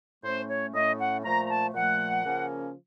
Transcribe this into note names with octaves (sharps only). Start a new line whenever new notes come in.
A2 A3 C#4 C5
C#5
A2 A3 C#4 D#5
F#5
A#2 F3 A3 A#5
A#5
A5
A#2 F3 A3 F#5
C#3 F3 A#3 C#4